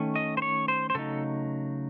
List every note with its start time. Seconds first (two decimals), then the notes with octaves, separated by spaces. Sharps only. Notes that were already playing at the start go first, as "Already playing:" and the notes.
Already playing: D#3 A3 C#4
0.16 D#5
0.37 C5
0.42 C#5
0.68 C5
0.90 C5
0.95 C#3 F#3 A3 D#4 A4